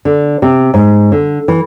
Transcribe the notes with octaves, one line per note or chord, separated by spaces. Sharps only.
D3
C3
G#2
D3
E3